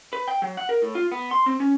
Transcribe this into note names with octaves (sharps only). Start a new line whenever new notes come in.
B4
G5
F#3
F#5
A#4
A2
F4
B3
C6
C4
C#4